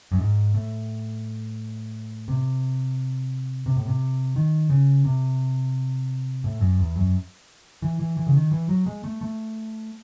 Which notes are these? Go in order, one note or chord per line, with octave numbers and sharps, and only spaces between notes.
F#2
G#2
A2
C3
C3
A2
C3
D#3
C#3
C3
A2
F#2
E2
F#2
E3
E3
E3
C#3
D#3
E3
F#3
G#3
A3
A3